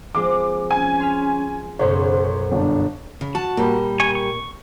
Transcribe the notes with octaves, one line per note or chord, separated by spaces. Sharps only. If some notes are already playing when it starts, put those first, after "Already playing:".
F3 G#3 C4 D6
C#4 G#5
C6 F6 B6
B1 F#2 C#3 C5 C#5
G1 D4
C#3
F#4 A5
A#2 G3 A#3
G#5 C#6
C#6